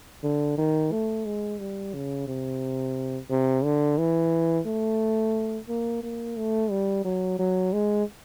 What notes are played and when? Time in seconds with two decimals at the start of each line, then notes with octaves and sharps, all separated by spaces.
0.23 D3
0.58 D#3
0.92 A3
1.26 G#3
1.60 G3
1.94 C#3
2.27 C3
3.30 C3
3.64 D3
3.98 E3
4.66 A3
5.68 A#3
6.03 A#3
6.37 A3
6.70 G3
7.05 F#3
7.39 F#3
7.73 G#3